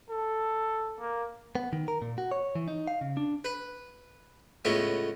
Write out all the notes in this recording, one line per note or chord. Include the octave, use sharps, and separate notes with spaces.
A4
A#3
B3
D#3
A#4
A#2
F#4
C#5
E3
D#4
F5
C#3
D4
B4
C#2 A2 B3 C#5